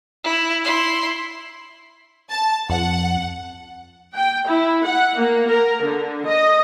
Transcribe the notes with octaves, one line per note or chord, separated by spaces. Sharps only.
E4
E4 C6
A5
F2 F#5
G5
E4
F#5
A#3
A#4
D3
D#5